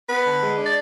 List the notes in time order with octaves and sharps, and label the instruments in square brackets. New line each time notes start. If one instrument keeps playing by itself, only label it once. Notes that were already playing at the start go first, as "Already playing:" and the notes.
[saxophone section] B3 [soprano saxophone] B4
[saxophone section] D3
G#3
D4
[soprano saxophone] D5